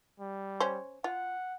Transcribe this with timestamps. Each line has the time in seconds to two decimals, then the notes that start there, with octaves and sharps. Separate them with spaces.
0.20 G3
0.60 C#4 C5
1.04 F4 F#5